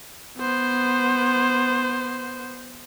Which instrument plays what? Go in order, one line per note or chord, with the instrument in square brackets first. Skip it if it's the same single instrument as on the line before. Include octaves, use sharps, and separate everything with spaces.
[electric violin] B3 C5